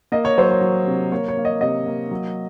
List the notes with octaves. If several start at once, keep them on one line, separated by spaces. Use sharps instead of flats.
A#3 D#5
C#5
F#3 C5
C#5
F#3
C3
A#3 C#5
C#5
A#3
D#5
C3 D#5
A#3
F#3